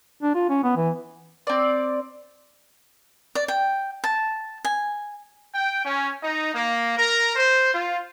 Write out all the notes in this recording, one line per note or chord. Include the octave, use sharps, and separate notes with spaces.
D4
F4
C#4
B3
E3
C4 D5
D5
G5
A5
G#5
G5
C#4
D#4
A#3
A#4
C5
F4